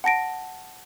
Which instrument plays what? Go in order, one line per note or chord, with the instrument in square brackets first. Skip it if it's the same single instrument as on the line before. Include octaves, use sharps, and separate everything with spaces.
[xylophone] F#5 A5 A#6 D7